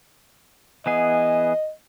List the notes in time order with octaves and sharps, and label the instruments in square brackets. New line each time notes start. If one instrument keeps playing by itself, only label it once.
[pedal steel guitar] E3 B3 G#4 [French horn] D#5